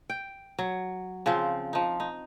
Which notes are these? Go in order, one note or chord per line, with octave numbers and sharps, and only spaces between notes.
G5
F#3
C#3 F3 C4
F3 D#4
D#4